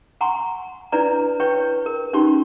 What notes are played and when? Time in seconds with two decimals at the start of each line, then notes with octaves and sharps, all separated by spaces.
0.21 F#5 G#5 A#5 C6 C#6
0.92 D4 E4 B4 D5 G#5 A#5
1.40 E4 B4 C#5 G5 C#6
1.86 A#4
2.13 C#4 D#4 F4 G4 C6 C#6